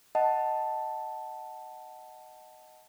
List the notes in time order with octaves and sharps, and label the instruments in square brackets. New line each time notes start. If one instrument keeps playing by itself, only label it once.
[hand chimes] D#5 F#5 A5